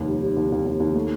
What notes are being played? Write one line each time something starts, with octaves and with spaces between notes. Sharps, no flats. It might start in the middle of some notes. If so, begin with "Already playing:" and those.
Already playing: F1 D#2
G3
G3
D#2
D#2
D#2
D#2
A3